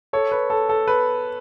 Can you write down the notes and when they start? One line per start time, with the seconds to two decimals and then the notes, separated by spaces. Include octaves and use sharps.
0.13 A4 C#5
0.32 B4
0.50 A4
0.69 A4
0.87 B4